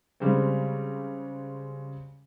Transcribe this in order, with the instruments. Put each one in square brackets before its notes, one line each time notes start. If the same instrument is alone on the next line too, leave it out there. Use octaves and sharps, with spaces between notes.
[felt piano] C#3 G3 G#3 C4